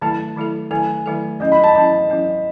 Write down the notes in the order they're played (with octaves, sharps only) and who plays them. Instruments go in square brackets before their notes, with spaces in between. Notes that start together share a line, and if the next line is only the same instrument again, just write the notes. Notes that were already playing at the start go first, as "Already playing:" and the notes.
[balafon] D#3 F#3 A3 E4 A4 [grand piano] A5
[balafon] D#3 F#3 A3 E4 A4
[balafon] D#3 F#3 A3 E4 A4 [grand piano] G#5
[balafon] D#3 F#3 A3 E4 A4
[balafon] F#3 C#4 E4 [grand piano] D#5
[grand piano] B5
A5
[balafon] F#3 C#4 E4 [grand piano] A5
[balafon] F#3 C#4 E4